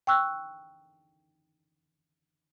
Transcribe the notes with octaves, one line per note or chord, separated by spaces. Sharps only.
G5 C#6 E6 F#6